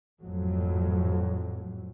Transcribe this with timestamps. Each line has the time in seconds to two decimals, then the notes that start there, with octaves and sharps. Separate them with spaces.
0.22 G#1 F2 A2 F#3